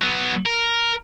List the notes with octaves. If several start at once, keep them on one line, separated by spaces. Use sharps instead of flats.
F#3 B3
A#4